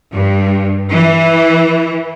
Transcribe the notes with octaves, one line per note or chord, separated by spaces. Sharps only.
G2
E3